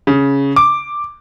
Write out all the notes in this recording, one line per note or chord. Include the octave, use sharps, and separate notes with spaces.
C#3
D6